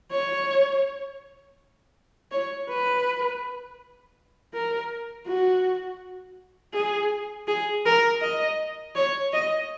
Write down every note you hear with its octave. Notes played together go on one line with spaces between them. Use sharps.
C#5
C#5
B4
A#4
F#4
G#4
G#4
A#4
D#5
C#5
D#5